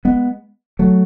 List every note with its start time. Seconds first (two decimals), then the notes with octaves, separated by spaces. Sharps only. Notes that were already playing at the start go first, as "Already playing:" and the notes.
0.05 G#3 B3
0.79 F#3 A3